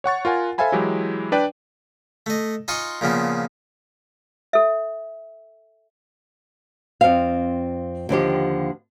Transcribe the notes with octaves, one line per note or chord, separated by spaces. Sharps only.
C#5 F#5 C#6 A6
F4 A#4 F#5 G#5
A4 C5 E5 F5 G#5 B5
E3 F#3 G#3 E4 G4
D4 B4 D5 G5
A3 D#5
D#4 F4 G#5 C6 C#6 D#6
A#2 C#3 F3 B3
A4 E5
F2 C4 F5
D#2 D3 F3 G4